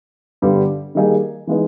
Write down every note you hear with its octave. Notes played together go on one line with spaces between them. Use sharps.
G2 D3 G3 B3
D#3 G3 A#3 D#4 G#4
E3 G#3 B3 D#4